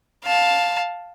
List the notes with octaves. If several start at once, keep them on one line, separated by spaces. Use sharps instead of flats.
F5 A5